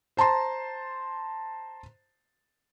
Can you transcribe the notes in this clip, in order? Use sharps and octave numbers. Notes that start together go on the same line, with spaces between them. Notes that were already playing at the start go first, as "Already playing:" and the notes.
C5 A5 A#5 C6